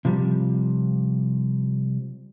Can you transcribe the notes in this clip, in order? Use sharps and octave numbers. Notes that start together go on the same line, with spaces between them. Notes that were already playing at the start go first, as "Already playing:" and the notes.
C3 F3 G3